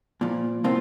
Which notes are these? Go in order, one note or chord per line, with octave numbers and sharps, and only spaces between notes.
A#2 F3
C2 A2 A#3 C4 F4 C5